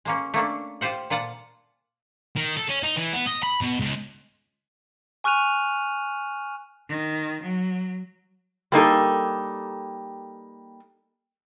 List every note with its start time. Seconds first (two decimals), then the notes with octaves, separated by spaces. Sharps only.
0.05 G#3 A#3 C#4
0.34 A3 A#3 C#4 D4
0.81 F4 G4 C5 F#5
1.10 A#2 F4 F#5 A5
2.36 D#3
2.57 A4
2.69 C#4
2.83 D#4
2.96 E3
3.13 B3
3.27 D#5
3.43 B5
3.61 B2
3.79 C#2
5.24 G#5 C#6 F6 F#6 D#7 F7
6.89 D#3
7.43 F#3
8.72 G3 A#3 D#4 A4